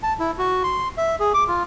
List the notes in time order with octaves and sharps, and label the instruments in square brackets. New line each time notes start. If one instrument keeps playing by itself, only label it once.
[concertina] A5
E4
F#4
C6
E5
G#4
D6
F4